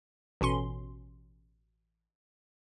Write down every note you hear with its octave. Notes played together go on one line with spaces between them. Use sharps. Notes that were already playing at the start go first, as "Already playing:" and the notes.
A1 B2 C#4 C6